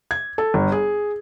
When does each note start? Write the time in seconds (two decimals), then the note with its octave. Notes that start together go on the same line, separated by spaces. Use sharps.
0.11 G#6
0.38 A4
0.54 G1
0.72 G#4